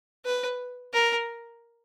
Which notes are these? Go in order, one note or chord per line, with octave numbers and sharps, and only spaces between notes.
B4
A#4